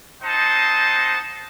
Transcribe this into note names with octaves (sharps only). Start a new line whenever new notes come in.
C4 D#4 C5 D#5 F#5 A5